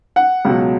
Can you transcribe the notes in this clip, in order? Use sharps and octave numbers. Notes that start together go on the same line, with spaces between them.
F#5
C#2 B2 F#3